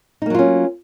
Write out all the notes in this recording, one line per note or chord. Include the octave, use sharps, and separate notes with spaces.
F#3 A#3 C#4 D#4 F4